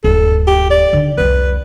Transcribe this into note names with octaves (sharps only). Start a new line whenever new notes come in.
D1 G2 A4
G4
D5
D3 D#3
C2 F2 B4